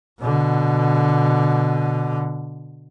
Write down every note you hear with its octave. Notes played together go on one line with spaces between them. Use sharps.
B2 D3